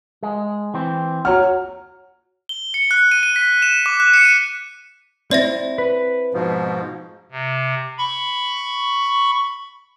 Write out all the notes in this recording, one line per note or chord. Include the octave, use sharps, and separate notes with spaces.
G#3
E3 C4
F#4 C#5 F#5 A#5 F6
G7
C#7
F#6
D#7
D#7
B6
E7
D6
F#6
C#7
D#7
C4 E4 D5 E5 A#6
B4
G#2 B2 F3
C3
B5 C#6